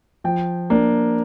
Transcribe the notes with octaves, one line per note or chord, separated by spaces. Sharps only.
F3 G5
A#3 D4